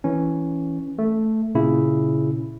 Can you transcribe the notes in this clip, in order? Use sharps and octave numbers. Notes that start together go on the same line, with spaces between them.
E3 C#4
A3
A#2 C#3 E4